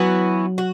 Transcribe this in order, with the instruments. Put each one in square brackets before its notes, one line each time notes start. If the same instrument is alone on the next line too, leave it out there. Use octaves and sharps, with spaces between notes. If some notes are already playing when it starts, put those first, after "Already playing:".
Already playing: [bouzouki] E3 B3 F#4 [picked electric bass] F#3
[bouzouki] F#4